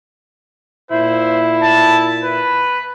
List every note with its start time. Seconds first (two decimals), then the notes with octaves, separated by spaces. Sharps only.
0.91 A#2 E4 C5
1.63 A5
2.24 B4